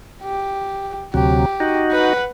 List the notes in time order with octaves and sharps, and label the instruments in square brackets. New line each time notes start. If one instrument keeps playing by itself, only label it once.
[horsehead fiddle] G4
[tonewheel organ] D2 C3 F#3 [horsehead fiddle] G4
[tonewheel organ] D#4 F#4
[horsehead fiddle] B4 F#5